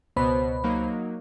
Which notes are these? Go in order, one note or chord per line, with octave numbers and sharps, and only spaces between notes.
C#2 B2 B3 C5 B5
F#3 A#3 D#4